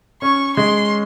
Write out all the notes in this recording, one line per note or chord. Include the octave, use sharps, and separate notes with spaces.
C#4 C#6
G#3 C6